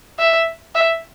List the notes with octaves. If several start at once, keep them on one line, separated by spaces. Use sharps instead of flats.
E5
E5